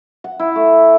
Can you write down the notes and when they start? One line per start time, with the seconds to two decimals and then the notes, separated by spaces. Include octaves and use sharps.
0.24 F#5
0.39 E4
0.56 A3